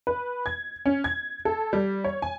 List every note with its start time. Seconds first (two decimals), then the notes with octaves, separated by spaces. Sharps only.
0.07 B4
0.46 G#6
0.86 C#4
1.04 G#6
1.45 A4
1.73 G3
2.04 C#5
2.22 G#5